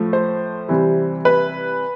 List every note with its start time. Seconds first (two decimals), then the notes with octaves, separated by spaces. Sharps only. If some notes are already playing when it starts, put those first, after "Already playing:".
Already playing: A2 F3 A3
0.13 C5
0.69 C3 E3 G3
1.25 B4